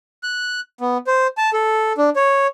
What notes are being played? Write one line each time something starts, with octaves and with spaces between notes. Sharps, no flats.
F#6
B3
C5
A5
A4
D4
C#5